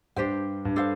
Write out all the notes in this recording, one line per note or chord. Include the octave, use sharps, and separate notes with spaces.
G2 D4 G4 C5 G5
G2
D4 A4 C5 F5